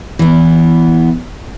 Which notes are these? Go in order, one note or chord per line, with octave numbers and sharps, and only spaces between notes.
E3 B3